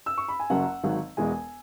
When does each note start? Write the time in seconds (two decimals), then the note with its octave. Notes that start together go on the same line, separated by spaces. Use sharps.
0.06 E6
0.18 C#6
0.28 B5
0.40 G#5
0.50 F#1 F#2 F#3 F#5
0.84 G#1 G#2 F#3
1.17 E1 E2 E3 G#3 G#5